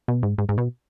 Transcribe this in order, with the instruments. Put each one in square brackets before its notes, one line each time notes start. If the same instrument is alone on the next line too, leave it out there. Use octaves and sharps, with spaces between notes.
[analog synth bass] B2
G#2
G#2
G#2
B2